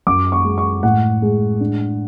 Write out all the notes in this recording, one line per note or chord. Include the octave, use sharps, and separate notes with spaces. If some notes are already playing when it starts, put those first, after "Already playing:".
F#2 D6
C#6
G#3
C#6
A2 F#5
G#3
D4